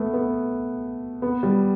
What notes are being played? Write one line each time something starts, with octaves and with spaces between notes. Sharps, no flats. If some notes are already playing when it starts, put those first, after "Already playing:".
Already playing: A3 B3
B3
B3
G3